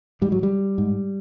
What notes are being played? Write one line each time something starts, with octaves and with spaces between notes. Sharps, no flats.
G#2 G3
F#3
G3
G#2